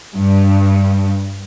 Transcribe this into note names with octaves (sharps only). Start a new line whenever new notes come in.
G2